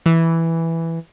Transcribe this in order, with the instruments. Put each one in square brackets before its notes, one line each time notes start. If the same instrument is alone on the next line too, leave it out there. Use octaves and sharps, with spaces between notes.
[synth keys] E3